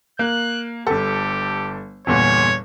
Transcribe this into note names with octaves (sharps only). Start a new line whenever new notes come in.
A#3 F#6
G1 G4 A4
G1 E2 A#2 C#5